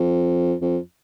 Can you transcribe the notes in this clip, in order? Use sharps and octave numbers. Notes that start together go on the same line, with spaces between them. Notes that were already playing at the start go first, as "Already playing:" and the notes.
Already playing: F2
F2